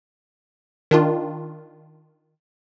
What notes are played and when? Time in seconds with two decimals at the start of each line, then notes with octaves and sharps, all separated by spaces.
0.91 D#3 D4 F4